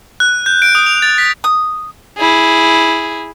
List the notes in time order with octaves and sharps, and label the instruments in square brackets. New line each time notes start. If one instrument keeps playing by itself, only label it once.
[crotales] F#6
G6
D7
D#6
F7
A6
B6
[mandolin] D#6
[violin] E4 G#4